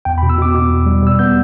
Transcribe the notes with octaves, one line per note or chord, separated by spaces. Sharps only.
E2 G5
B5
B2
E6
B2 D6
B2
E2
G3
G3 E6
B3 G6